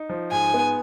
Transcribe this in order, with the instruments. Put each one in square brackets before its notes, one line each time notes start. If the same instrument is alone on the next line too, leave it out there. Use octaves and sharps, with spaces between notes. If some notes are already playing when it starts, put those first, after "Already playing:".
Already playing: [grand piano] D#4
F3
[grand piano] G#2 [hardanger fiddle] G#5
[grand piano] B3